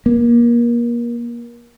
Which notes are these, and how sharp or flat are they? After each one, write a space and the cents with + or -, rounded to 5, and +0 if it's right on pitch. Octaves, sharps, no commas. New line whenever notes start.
A#3 +30